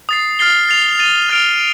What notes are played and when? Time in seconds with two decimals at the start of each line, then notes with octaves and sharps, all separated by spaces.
0.09 D#6 A6 C7
0.39 F6 A6 C7 G7
0.69 A6 C7 F7
0.99 A6 D#7 G7
1.29 F6 A6 D7 F7